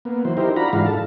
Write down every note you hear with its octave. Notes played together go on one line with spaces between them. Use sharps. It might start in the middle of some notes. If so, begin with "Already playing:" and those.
A#3 B3
E3 F#3 C5
D#4 E4 G4 A#4 C5
D4 F4 F#4 A#5 B5
G#2 E3 G#3 D4 F#4 F5
A4 A5